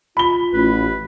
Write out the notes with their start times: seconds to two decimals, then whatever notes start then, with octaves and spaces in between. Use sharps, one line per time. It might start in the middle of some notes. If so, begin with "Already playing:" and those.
0.17 F4 B5 G7
0.53 A1 B4